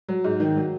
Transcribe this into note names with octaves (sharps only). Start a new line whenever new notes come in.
F#3
G#2
D#3
F#3